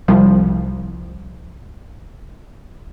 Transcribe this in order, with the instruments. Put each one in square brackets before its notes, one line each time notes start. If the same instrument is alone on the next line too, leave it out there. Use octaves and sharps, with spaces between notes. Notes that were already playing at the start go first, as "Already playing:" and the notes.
[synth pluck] C2 F3